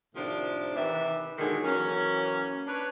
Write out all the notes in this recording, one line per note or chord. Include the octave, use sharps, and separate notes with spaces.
A2 C3 D#3 F3 D4
C3 D#3 E3 D5 E5
A#2 D3 D#3 F#3 G#3 G#4
E3 F#3 A#3 C#4
D4 B4 C#5